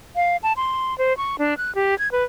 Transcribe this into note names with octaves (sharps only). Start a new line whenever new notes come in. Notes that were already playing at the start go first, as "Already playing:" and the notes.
F5
A5
C6
C5
C#6
D4
F#6
G4
G#6
B4